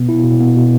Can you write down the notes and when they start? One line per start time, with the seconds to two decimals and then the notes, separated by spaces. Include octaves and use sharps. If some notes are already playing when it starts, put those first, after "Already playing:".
Already playing: B2 B3
0.09 E4
0.24 B2
0.40 B3
0.56 B2